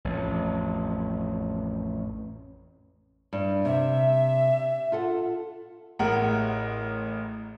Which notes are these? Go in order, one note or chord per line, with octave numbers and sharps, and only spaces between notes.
A1 F2
G2
C3 E5
F4 A4 F#5
A1 A2 G#3 A#4 F#5